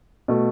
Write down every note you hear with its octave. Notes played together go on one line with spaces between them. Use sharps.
B2 A3